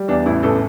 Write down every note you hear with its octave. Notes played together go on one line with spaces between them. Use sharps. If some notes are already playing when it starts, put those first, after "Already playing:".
Already playing: G3
E2 D4
A1 E4
A1 A4